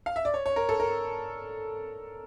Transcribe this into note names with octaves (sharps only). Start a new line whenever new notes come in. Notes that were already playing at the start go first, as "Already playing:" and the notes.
F5
E5
D5
C#5
C#5
A#4
A4
A#4